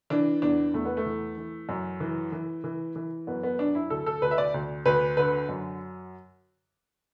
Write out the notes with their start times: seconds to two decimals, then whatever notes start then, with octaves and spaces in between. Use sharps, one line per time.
0.10 E3 D4
0.42 E2 D4
0.74 E2 A3
0.85 B3
0.97 A3
1.06 E3
1.38 E3
1.69 F#2
2.00 E3
2.32 E3
2.64 E3
2.96 E3
3.27 F#2 B3
3.43 B3
3.59 F#2 D4
3.75 E4
3.90 D2 A4
4.06 A4
4.22 D2 B4
4.31 E5
4.38 D5
4.54 D2
4.86 D2 B4
5.17 D3 B4
5.49 F#2